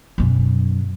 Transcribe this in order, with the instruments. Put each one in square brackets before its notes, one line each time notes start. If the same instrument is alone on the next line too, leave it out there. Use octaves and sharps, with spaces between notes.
[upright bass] F#2 B2